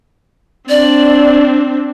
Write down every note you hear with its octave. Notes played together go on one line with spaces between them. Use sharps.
C4 D4 D5